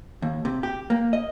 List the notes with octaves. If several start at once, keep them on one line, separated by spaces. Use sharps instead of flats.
D#2
C3
G4
A#3
D#5